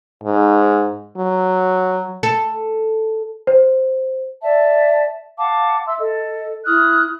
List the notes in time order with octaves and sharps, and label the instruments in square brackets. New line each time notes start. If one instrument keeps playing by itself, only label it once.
[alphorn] G#2
F#3
[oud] A4
[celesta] C5
[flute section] D5 E5 A5
F5 F#5 A5 D6
E5 C6 E6
A4 D#5
E4 D#6 F6 F#6